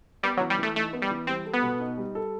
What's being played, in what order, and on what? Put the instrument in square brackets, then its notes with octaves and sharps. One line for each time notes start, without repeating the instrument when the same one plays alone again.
[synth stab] G3 [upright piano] B3
[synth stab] F#3
[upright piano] E3
[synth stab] G3
[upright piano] E3 [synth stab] A3
[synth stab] A3 [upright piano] D#4
[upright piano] B3
[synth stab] G3
[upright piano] E3
[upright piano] G3 [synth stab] C4
[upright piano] A4
[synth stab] B3
[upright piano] B2
D#4
G3
A4